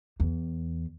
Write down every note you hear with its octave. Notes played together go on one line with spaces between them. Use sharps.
E2